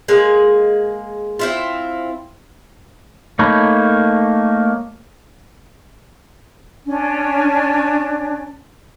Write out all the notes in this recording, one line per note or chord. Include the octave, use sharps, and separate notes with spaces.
G#3 A#3 G#4
C4 E4 F4
A3 A#3 D#4 C#5 B5
C#4 D4